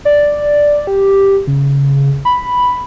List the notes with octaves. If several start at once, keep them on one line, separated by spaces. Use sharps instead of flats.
D5
G4
C#3
B5